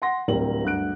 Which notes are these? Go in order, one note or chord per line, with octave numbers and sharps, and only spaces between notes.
F#5 C6 A#6
D1 G3 C4 A#4 F#7
D2 G2 F#6 D7